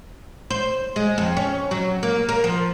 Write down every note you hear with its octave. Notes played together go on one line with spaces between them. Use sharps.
C5
G#3
F2
C#4
F#3
A#3
A#4
F3